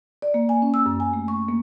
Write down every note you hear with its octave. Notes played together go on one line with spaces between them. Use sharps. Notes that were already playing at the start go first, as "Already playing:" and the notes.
D5
A#3
G#5
C#4
E6
F#2
G#5
A3
C#6
A#3